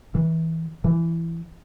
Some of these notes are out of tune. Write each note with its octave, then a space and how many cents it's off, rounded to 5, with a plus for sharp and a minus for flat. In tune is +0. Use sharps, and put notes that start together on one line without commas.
E3 -20
E3 +15